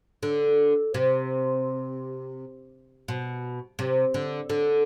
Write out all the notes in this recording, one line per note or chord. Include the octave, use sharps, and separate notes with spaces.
D3
C3
B2
C3
D3
D3